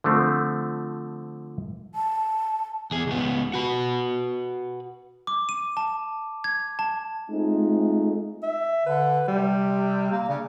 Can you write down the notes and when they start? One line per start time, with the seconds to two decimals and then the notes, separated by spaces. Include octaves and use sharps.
0.04 D3 F3 A3 C4
1.95 A5
2.91 E2 G#4
3.07 C#2 B3
3.54 F#4 B4
5.27 D6
5.49 D#7
5.77 A5
6.44 G#6
6.79 A5
7.30 G#3 A3 C4 D#4 F4
8.43 E5
8.86 D3 B4
9.28 C3 G3
10.11 A#3
10.29 C#3 D4